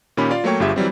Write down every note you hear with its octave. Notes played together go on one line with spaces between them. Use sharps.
A#2 D#3 C#4 G4 B5
F4 D5 F5
F#3 A3 A#3 C#5 G5 C#6
G1 G2 F4 G4 G#4 E5
E3 F#3 G3 C4